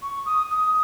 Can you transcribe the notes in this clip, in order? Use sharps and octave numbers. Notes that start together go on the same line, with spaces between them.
C#6
D#6
D#6